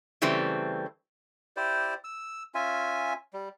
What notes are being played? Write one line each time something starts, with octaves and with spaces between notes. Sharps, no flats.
C#3 E3 G3 A3 C4
E4 G4 C5 D5
E6
C#4 F4 E5 G#5
G3